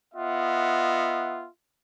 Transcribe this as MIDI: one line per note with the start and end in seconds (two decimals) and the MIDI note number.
0.14 1.47 59
0.14 1.47 65
0.14 1.47 75
0.14 1.47 76
0.14 1.47 78